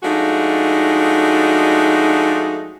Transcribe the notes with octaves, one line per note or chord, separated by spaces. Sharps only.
F3 G#3 A3 D4 D#4 F#4